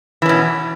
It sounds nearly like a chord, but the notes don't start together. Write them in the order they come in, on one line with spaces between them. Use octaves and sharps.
E3 C#4 B2